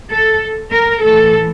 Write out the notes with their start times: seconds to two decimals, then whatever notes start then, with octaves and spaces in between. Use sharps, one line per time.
0.11 A4
0.72 A#4
1.03 A2 E3 A4